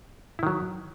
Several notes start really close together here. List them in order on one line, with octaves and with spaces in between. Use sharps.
E4 D#3 F#3